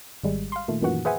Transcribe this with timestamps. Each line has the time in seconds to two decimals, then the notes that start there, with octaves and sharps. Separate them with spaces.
0.24 G#1 G3 G#3
0.52 F5 C6
0.68 A#2 D#3 A3
0.82 F#2 A#2 D#3 E3 F#4 F#5
1.05 G#4 B4 C5 E5 F#5 G#5